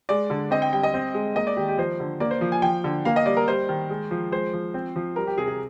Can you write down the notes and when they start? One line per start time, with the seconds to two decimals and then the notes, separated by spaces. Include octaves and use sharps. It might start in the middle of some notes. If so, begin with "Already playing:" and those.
0.09 G#3 D5
0.30 D3
0.51 C4 D#5
0.62 G5
0.72 G3 G5
0.83 D#5
0.94 C4
1.14 G#3
1.36 A#3 D#5
1.47 D5
1.57 D#3 G4
1.68 G4
1.78 F3 C5
2.00 D3
2.20 A#3 D5
2.31 C5
2.41 F3
2.52 G#5
2.62 F3 G5
2.84 D3
3.05 A#3 F5
3.16 D#5
3.26 G3 D5
3.37 A#4
3.48 G3 C5
3.69 D#3
3.90 G#3
4.11 F3
4.31 G#3 C5
4.53 F3
4.74 C4
4.96 F3
5.16 G3 A#4
5.27 G4
5.38 C3 G#4
5.48 G#4